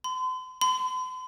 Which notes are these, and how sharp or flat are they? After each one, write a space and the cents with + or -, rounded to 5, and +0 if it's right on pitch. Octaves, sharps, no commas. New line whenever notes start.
C6 -40
C6 -45